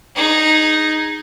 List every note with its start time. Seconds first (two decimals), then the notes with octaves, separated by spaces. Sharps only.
0.15 D#4 G#4